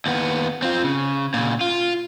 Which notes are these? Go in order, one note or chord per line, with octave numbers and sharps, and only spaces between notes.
D#2 B3
C4 F4
C#3
A#2 C#3
F4